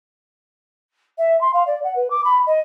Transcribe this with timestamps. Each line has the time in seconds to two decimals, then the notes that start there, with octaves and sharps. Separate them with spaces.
1.18 E5
1.40 C6
1.53 F5
1.66 D5
1.83 F#5
1.95 B4
2.10 D6
2.24 B5
2.46 D#5